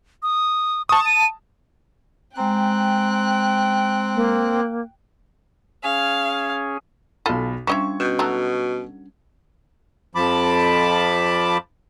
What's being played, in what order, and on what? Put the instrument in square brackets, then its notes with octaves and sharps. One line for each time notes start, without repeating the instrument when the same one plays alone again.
[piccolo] D#6
[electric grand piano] A5 D#6 [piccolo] C#6
[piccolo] D#7
[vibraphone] G#3 A#5 [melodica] C4 [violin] G5 F#6
[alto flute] A#3
[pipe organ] C#4 G#4 G#5 [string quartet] F5
[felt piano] B1 B5 [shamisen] F4 A4
[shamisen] F3 D#5 E5 [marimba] G3 C#4 D4 [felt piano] C#6 G#6
[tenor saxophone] B2 [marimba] C#4 G6
[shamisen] F#3 A3 D#4 [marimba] A5 E6 F#6
[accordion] F2 F3 A5 B5 D6